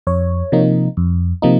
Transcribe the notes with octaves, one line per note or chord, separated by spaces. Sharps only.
F2 C#5
C3 F3 A#3 D#4
F2
C3 F3 A#3 D#4